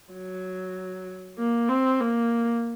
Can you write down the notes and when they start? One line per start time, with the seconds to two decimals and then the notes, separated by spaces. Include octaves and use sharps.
0.13 F#3
1.38 A#3
1.69 C4
2.00 A#3